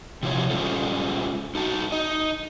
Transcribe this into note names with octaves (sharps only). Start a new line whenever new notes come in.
C3 F3 E4 F4 C#5
G3 G#3 C#4 F4 A4 C5
D#4 F#4 A5
D#4 D#5